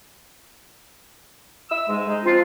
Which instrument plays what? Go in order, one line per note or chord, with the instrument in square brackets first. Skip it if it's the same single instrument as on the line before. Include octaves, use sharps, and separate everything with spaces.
[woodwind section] E5 E6
G#2 G#3
G#3 D#4
[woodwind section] F3 C4 D4 [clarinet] F4